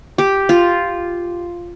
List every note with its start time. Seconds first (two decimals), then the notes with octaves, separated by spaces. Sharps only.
0.18 G4
0.49 F4